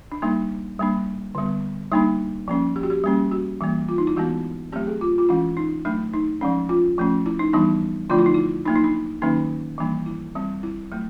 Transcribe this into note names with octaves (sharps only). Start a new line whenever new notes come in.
D4
G3 A#3 D4 D#4
G3 A#3 D4
D3 G3 B3
G3 A#3 D4 D#4
F3 A#3 C#4
G4
F#4
G4
G3 A#3 C#4
F#4
E3 G3 A#3
F4
D#4
E4
E3 G#3 B3 F#4
F#3 A3 C4 G4
G#4
F4
F4
E3 G#3 C#4 E4
D#4
F#3 A3 D4
D#4
F3 G#3 C#4
F4
F3 A3 C#4
E4
D#4
E3 G3 B3 D4 D#4
D3 F3 A3 D4 F4
E4
D#4
E4
F#3 A#3 D4 D#4
D#4
D4
D#3 F#3 A#3 C#4 D#4
E3 G3 A#3 D4
E4
G3 C4
E4
F#3 A3